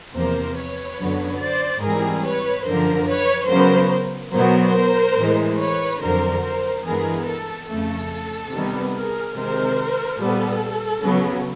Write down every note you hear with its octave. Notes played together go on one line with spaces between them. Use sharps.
E2 C3 F3 A#3 A#4 C5
B4 C#5
F#2 D3 F#3 B3
C5 D5
G#2 E3 G3 C4 G#4 A#4
B4 C#5
F#2 D3 F3 A#4 C5
B4 C#5
C#3 F#3 B3 A#4 C5
B2 F#3 B3 A#4 C5
A2 E3 G#3
B4 C#5
F2 D3 F#3 A#4 C5
A#4 C5
G2 E3 G#3 B3 G#4 A#4
A4
F2 C#3 F3 A3 A4
C3 D#3 G3 B3
G#4 A#4
C3 D#3 G#3 A#4 C5
A#2 G3 B3 A4
C#3 F#3 B3